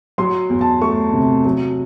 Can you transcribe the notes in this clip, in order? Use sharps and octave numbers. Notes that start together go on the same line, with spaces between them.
F#3 C6
E2
A5
A3 C#6
C3
F#3